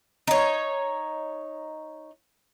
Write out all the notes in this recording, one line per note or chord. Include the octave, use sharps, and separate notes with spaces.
D#4 C#5